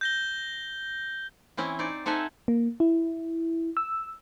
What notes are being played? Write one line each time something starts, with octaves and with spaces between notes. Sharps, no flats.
G6 A#6 G7
E3 C4 C#4 E4
D#4 C5 D5
C4 D#4 A4 E5 F#5 G#5
A#3
E4
E6